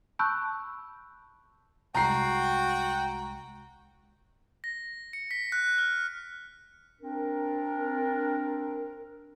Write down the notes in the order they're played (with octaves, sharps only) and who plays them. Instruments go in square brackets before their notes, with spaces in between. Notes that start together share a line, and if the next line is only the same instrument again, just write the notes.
[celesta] A5 B5 C#6 E6 F#6 G6
[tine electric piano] C2 G#3 [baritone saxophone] F#4 [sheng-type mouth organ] G5 [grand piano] A#5 C7
[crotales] A#6
C#7
B6
F#6
F6
[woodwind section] C4 D4 A#4